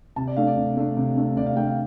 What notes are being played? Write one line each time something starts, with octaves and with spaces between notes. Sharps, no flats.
C3 A5
D5
A3 D4 F5
D5
C3
A3 D4
C3
A3 D4
C3 D5
F5
A3 D4 G5
F5